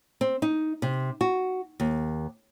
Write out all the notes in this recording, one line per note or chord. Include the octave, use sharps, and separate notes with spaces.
C4
D#4
C3
F#4
D#2